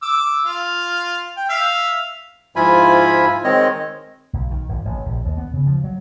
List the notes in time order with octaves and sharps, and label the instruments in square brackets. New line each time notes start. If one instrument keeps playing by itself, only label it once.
[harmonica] D6 E6
F4
G5
E5 F5
[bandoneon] G#2 F3 E4 F4 G#5 B5
D#3 G#3 C4 C#5 D#5
[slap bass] B1
D#3
G#1
A1
A#1
D#2
B3
C#3
F3
F#3